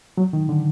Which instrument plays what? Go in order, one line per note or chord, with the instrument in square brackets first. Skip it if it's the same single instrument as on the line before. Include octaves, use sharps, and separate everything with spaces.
[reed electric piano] F#3
D#3
D3